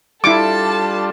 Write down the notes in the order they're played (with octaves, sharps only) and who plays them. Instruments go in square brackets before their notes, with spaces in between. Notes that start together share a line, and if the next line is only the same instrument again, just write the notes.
[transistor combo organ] G3 D4 F4 [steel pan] E4 D6 [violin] A4 A5